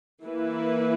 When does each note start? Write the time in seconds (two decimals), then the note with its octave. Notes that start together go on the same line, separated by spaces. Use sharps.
0.23 E3 A#3 E4 B4